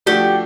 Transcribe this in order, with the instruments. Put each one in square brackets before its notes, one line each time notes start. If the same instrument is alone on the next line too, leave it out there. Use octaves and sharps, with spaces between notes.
[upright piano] F3 A3 D4 F#4 [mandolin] G4